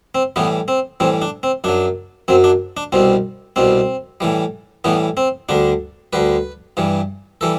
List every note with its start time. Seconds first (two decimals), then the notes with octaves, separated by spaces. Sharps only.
0.15 C4
0.36 A2 E3 G3 B3
0.68 C4
1.00 A2 E3 G3 C4
1.22 D4
1.43 C4
1.64 F#2 F#3 D4
2.28 F#2 F#3 C4
2.44 D4
2.77 D4
2.92 C2 B2 G3 C4
3.56 C2 B2 G3 C4
4.20 A2 E3 G3
4.84 A2 E3 G3 B3
5.17 C4
5.49 D2 D3 G3 D4
6.13 D2 D3 G3 B4
6.77 G2 E3 G3
7.41 E3 G3 A4